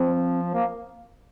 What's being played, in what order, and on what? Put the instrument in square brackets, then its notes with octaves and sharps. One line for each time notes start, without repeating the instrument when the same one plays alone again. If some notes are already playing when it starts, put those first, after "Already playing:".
Already playing: [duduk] F3 [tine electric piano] C4
[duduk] A#3